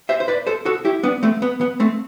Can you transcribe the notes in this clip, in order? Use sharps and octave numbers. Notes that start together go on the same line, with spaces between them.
C5 E5
C5
B4 D5
A4 C5
F#4 A4
E4 G4
B3 D4
A3 C4
B3
B3
A3 C4